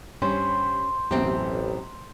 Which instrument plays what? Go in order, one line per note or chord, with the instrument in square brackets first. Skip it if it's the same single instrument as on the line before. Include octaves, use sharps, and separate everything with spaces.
[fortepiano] G2 [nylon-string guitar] C#4 [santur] C5
[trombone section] A1 [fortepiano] F#2 B2 [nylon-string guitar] C4 G4